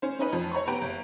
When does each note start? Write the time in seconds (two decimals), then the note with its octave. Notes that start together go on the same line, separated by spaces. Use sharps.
0.02 C#4 C5
0.19 C#4 D#4 B4
0.33 F2
0.51 C#5 A#5 B5 C#6
0.67 B3 G4 B4 A#5 D7
0.81 F#1